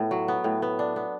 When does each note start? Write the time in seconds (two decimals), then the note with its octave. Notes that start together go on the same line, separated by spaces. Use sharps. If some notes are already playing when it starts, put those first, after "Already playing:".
Already playing: A2 B3
0.11 F#3
0.28 B3
0.44 A2
0.62 B3
0.79 D4
0.96 B3